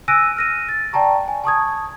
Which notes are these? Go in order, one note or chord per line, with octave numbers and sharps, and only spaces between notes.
G#5 E6 F#6 A#6 D7 D#7
F6 A#6 D#7
A6
D5 G5 A5 A#5 C#6
G#5
A5 C#6 D#6 G#6